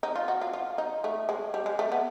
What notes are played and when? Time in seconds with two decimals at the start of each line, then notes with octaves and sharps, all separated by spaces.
0.03 D#4
0.16 F4
0.28 F#4
0.41 F4
0.53 F4
0.78 D#4
1.04 A3
1.29 G#3
1.54 G3
1.66 G#3
1.79 A3
1.92 B3